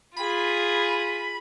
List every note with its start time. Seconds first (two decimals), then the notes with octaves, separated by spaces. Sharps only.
0.16 F4 G#4 B5